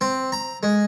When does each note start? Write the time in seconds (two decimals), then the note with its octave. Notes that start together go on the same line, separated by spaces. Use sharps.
0.01 C4
0.32 A#5
0.63 G#3